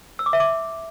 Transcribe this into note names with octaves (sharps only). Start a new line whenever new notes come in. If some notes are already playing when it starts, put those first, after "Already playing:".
E6
D6
E5
D6